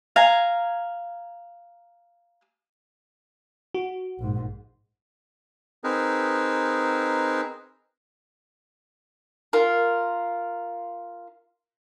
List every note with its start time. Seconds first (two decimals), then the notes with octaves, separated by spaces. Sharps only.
0.16 F5 G#5 A#5
3.74 F#4
4.19 A#1 G#2
5.84 C4 D#4 G#4 A#4 B4
9.53 F4 A#4